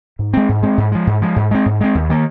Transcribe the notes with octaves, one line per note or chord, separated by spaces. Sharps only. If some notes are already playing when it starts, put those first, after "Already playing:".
G#2
G#3 C4
G#2
G#3 C4
G#2
F3 G#3
G#2
F3 G#3
G#2
G#3 C4
G#2
G#3 C4
D#2
D#3 A#3